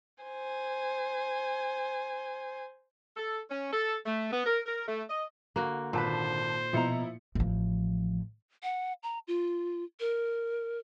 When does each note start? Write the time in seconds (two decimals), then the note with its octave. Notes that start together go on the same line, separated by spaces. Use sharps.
0.23 C5 G#5
3.17 A4
3.50 C#4
3.72 A4
4.05 A3
4.31 B3
4.46 A#4
4.65 A#4
4.86 A3
5.09 D#5
5.56 D3 A#3 F#4
5.93 G#1 A#2 B4 C5 A5
6.73 B2 F3 E4 A#5 C#7
7.35 A1 F3
8.63 F#5
9.03 A#5
9.28 F4
10.00 A#4